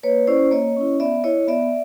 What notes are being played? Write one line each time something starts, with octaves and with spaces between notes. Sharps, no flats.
A#3 B4 C#5
C#4 E4 C5 D5
A#3 C#5 D#5
C#4 E4
B3 D5 E5
E4 C#5 D#5
B3 D5 E5